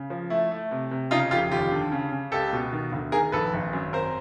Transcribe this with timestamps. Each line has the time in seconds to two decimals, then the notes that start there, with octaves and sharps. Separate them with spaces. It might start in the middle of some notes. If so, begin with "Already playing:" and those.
Already playing: C#3
0.10 F3
0.30 A3 E4
0.51 A3
0.71 C3
0.91 C3
1.11 C#3 D#4 F4
1.31 F1 F4 G4
1.52 D#2 F4 G4
1.72 D3
1.92 C#3
2.12 C#3
2.32 C#2 G4 A4
2.53 B2
2.73 D#3
2.92 D2
3.12 D#3 G#4 A#4
3.32 A#1 A4 B4
3.54 G#1
3.73 F#2
3.93 C4 A#4 C5